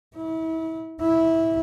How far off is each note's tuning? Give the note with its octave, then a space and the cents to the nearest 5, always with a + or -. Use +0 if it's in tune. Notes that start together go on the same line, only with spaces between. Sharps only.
E4 -35
E4 -15